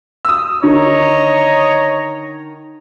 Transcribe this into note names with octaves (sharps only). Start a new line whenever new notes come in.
D#6 E6
D3 D#3 C#5 D#5 A#5